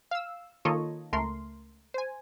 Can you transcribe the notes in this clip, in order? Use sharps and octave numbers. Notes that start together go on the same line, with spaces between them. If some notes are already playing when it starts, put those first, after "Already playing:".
F5 E6
D#3 A#3 F4 A4 C#5 D#5
C#2 A3 A#4 C6
C5 G#5